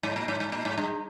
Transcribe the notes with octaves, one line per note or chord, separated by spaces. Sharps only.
G#2
A#2
G#2
G#2
A#2
G#2
G2